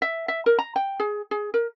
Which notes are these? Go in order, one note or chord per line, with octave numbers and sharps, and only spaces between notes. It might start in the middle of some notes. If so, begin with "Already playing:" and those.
E5
E5
A#4
A#5
G5
G#4
G#4
A#4